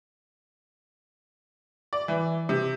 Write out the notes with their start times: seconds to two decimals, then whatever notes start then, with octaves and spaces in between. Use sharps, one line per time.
1.93 D5
2.08 E3
2.49 C3